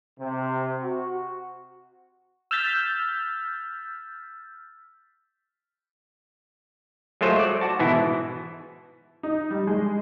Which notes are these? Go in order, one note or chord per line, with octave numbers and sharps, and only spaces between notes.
C3
F#4
E6 F6 G6 A6 B6
F#3 G#3 A3 F4 C5 C#5
D5
F#4 A5
G#2 B2 E3 E4
D#4
G3
G#3